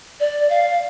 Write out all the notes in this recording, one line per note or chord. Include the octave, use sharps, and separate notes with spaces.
D5
F5